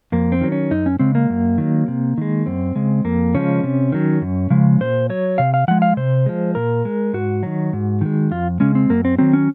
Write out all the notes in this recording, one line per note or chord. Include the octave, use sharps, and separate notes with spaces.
F2 A#3
C4
D#3 F#3
C#4
F#2 D#4
C#4
C#3 G#3 C4
A#3
F#2
D#3 F#3
C3
D#3 G#3
F#2 C4
C#3 G#3
F2 A#3
C#3 F3 G#3 C#4
C3
D#3 F#3
F#2
C#3 F3 G#3
A#2 C5
F#3 C#5
C3 F5
F5
F3 G#3 F#5
F5
C3 C5
F3 G#3
A#2 A#4
G#3
G#2 F#4
D#3 F#3
G#2
D#3 G#3
F2 F4
C#3 G#3 C#4
C4
F#2 A#3
C4
D#3 F#3 C4
C#4